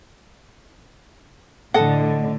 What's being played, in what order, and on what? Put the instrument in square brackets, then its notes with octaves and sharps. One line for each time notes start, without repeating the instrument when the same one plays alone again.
[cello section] A2 D3 [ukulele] A4 D#5 F#5